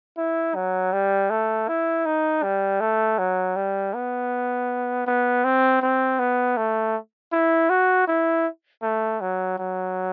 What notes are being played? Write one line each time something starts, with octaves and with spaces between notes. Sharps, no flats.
E4
F#3
G3
A3
E4
D#4
G3
A3
F#3
G3
B3
B3
C4
C4
B3
A3
E4
F#4
E4
A3
F#3
F#3